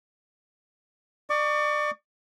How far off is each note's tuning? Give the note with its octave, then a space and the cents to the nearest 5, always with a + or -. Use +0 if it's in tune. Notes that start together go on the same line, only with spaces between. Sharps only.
D5 +30 C#6 +30